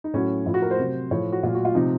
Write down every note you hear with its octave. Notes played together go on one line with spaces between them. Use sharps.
D#4
A2 F#3 C#4
A2 F3 F4
F#4
A#4
C5
C3 F#3
A2 F3 C#5
F#4
A#2 F#3 F4
F#4
F4
C3 F3 D#4